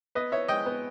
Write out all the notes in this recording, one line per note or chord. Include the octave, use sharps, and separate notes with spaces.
B3 B4 D#5
B3 C#5 E5
G#3 D#5 G5
B3